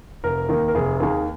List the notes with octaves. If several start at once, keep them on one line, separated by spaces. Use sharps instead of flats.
F1 A#4
D#2 D#3 A#3
A#4
F1 G#4
D#2 D#3 A#3 G#4